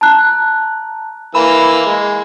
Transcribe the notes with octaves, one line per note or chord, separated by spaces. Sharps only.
A5 A#5 F#6
E3 A#3 B5 E6
G#3